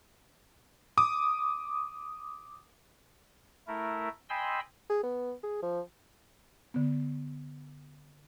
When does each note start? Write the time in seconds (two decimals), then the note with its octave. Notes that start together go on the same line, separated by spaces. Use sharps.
0.98 D6 D#6
3.67 A3 E4 A#4
4.29 D#5 G5 G#5 B5 C6 E6
4.90 G#4
5.04 B3
5.43 G#4
5.63 F3
6.74 D3 B3